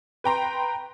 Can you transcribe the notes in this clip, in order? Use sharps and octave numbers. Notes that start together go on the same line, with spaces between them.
B4 G5 A#5 C6